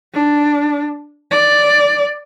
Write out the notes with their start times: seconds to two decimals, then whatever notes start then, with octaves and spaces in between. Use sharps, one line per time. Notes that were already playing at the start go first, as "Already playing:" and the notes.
0.14 D4
1.31 D5